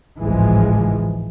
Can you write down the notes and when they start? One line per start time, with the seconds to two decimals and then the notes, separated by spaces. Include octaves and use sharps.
0.19 G#1 C#2 A2 E3 F3 G#3